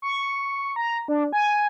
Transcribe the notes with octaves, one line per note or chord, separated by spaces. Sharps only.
C#6
A#5
D4
G#5